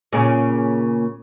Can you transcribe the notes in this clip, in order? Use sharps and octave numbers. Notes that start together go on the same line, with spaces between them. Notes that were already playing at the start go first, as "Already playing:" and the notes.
A#2 C#3